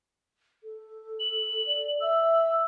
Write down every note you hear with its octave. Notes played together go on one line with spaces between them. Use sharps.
A4
F#7
D5
E5 E6